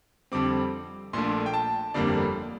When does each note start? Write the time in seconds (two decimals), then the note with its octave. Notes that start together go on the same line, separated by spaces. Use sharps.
0.32 F2 D3 G3 C4 D6
1.13 A#1 A#2 A3 D4 C6
1.46 G5
1.54 A5
1.94 G1 F2 D3 G3 A#3 D5